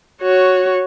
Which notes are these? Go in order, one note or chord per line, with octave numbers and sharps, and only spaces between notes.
F#4 C#5